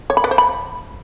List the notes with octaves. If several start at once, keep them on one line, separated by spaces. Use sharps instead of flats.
C#5
B5
B4
C5
B5